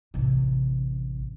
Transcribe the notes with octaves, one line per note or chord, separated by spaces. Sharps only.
A1 C3